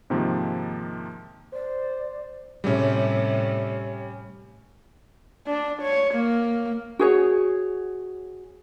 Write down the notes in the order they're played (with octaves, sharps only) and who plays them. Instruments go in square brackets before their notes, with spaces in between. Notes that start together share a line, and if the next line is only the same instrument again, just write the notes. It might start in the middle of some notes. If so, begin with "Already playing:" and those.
[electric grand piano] G#2 C3 D#3 F3 A#3
[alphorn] C5 [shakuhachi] D5
[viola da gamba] A2 C3 [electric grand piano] G3 C#4
[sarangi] D4
C#5
A#3
[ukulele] F#4 G#4 C#5